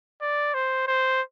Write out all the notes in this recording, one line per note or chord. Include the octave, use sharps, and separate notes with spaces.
D5
C5
C5